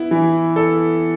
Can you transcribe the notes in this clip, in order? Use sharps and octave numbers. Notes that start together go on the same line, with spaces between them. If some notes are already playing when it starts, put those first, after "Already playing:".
Already playing: B3 E4
E3
A4